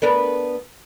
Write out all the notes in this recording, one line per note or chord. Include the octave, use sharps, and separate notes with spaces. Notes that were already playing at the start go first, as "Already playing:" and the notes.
B3 D4 A#4